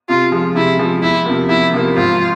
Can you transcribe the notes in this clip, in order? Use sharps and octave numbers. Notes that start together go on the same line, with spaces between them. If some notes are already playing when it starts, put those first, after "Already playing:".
C3 F4
F3 G#3
C3 E4
F3 G#3
E2 E4
C3 F3 A#3
E2 E4
C3 F3 A#3
G#1 F4